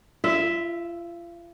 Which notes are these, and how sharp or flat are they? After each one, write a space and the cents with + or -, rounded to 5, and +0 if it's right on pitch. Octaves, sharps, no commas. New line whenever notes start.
F4 -35 E5 +0